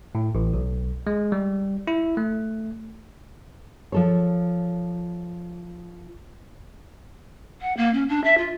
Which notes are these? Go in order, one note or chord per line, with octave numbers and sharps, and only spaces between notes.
A2
A1
B1
G#3
G3
E4
A3
F3 A4 C#5
F#5
A#3
C#4
D4
E5
F4